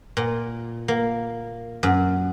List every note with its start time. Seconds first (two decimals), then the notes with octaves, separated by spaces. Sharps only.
0.17 A#2
0.88 A#3
1.83 F#2